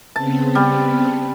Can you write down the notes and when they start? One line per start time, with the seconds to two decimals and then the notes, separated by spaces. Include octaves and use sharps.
0.16 C#3 B3 C4 A5
0.55 G3